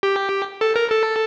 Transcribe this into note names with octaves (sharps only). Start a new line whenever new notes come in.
G4
A4
A#4
A4